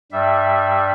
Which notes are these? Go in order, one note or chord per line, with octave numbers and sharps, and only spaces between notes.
G2 G3 E5